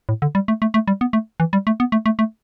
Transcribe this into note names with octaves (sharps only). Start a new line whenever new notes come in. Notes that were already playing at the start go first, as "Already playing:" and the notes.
A2
D3
G3
A3
A3
A3
G3
B3
A3
E3
G3
A3
B3
A3
A3
A3